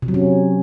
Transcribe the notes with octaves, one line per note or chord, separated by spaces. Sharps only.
C3
F#3
C#4